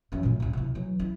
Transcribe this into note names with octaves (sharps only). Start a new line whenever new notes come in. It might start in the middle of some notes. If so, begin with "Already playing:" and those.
F#2 E3
D2 A#2
A1 D2
C3 E4
E3 F#3
E4